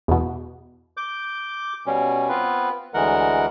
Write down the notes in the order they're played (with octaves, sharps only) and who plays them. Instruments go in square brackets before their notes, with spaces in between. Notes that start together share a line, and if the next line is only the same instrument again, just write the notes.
[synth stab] E2 B2
[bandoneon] D6 G6
B2 G3 C#4
B3 C4 F4 B4
D2 E3 G#3 A#4 F#5